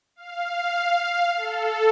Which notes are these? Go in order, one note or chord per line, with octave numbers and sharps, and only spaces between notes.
F5
A4